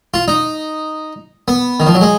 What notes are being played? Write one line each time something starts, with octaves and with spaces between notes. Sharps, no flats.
F4
D#4
B3
D#3
F3
F#3
G#3